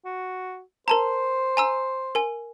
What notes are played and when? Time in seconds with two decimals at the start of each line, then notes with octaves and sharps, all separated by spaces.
0.05 F#4
0.88 A#4 C5 A5 A#5
1.57 G#5 A#5 E6
2.15 A#4 G#5